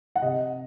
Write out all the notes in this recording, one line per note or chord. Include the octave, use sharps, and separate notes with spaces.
F#5
C3 D#5